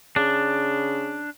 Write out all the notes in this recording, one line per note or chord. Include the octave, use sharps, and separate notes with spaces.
C#3 D4